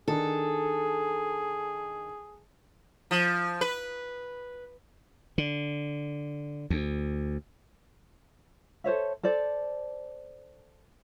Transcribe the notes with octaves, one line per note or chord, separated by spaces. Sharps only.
D#3 D4 G#4 A4
F3
B4
D3
D2
A4 C5 C#5 E5
A4 C5 D5